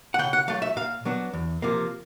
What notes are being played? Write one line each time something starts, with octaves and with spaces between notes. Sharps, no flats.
F#5
C#3 G5
F#5
F#3 A3 F5
E5
A#2 F5
F#3 B3 D4
E2
C3 F3 A#3